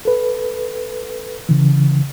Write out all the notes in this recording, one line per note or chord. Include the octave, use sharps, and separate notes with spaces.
A4 B4
C#3 E3